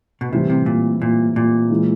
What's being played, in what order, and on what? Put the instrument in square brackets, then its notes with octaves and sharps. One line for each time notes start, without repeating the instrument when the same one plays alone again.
[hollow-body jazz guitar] B2
[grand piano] A2 E3 G3 C4 E4 [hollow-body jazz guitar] C3
[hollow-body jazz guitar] C3
A#2
A#2
A#2
[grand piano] E3 G#3